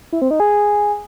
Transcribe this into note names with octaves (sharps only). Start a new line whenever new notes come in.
E4
C4
D#4
G#4